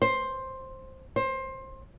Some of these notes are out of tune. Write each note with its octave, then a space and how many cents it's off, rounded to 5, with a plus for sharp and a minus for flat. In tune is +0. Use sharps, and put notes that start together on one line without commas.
C5 +10
C5 +20